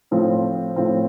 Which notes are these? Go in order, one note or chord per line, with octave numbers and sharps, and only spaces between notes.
A2 F3 C4
A2 F3 C4